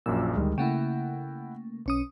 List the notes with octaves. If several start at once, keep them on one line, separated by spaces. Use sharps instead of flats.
A#1 F#2 A#2 E6
D2 D#3 G3 G#3
C#3 A3 A#3 E4 F#5 G5
B1 C#4 D#6